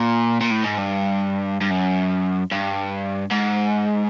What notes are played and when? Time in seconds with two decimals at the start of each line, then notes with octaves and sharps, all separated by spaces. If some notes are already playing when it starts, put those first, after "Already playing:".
Already playing: A#2
0.41 A#2
0.51 A2
0.64 G#2
0.78 G2
1.61 G2
1.71 F#2
2.52 G2
3.31 G#2